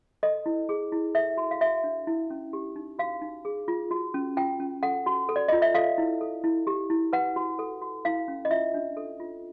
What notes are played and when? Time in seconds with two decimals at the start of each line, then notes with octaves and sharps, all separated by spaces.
0.23 A4 D#5
0.46 E4
0.69 G#4
0.92 E4
1.15 A4 E5
1.37 F#4
1.51 F5
1.61 F#4 E5
1.84 D4
2.07 E4
2.30 C#4
2.53 G4
2.76 D#4
2.99 F#4 F5
3.22 D#4
3.45 G#4
3.68 F4
3.91 F#4
4.14 C#4
4.37 F4 G5
4.60 C#4
4.83 A4 F#5
5.06 F#4
5.29 A4
5.36 D5
5.48 F4 D#5
5.62 E5
5.75 A4 F5
5.98 E4
6.21 A4
6.44 E4
6.67 G4
6.90 E4
7.13 B4 F#5
7.36 F#4
7.59 A4
7.82 F#4
8.05 E4 F5
8.28 C#4
8.45 D#5
8.51 F4 E5
8.74 D4
8.97 A4
9.20 F4